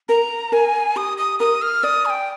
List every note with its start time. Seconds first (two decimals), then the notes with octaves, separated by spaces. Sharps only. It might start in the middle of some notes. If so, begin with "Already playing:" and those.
0.09 A#4 A#5
0.52 A#4 G#5
0.96 G4 D#6
1.18 D#6
1.39 A#4 D#6
1.62 F6
1.83 D5 D#6
2.06 G#5
2.10 G5